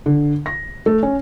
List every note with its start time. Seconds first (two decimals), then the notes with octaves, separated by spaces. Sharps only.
0.06 D3
0.46 A#6
0.86 A3
1.03 C#4